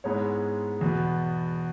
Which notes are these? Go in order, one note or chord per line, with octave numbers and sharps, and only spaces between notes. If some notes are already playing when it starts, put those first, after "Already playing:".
G#2 G#3 B3 E4 C#5
E2 B2 B3